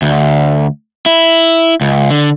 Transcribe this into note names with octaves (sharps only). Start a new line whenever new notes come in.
D2
E4
C#2
D3